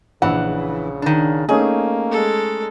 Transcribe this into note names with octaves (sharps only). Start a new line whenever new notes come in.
A#1 C#3 E3 F#5
D#3 D4
A3 A#3 C#4 D#4 G#4
G#3 A4